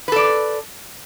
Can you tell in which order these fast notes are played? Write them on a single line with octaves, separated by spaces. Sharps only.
B4 A4 D5